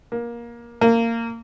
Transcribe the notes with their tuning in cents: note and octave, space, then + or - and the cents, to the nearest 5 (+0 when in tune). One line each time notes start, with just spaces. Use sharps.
A#3 +20
A#3 -20